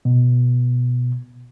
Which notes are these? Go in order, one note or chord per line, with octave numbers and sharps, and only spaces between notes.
B2